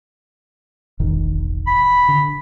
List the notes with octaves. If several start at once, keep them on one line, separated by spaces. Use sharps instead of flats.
E1 A1 D#3
B5
D3